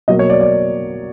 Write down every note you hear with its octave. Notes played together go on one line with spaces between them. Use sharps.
B2 F#3 A#3 D#5
C#5
D5
D5